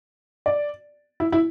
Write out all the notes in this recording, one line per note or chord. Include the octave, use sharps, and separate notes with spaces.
D5
E4
E4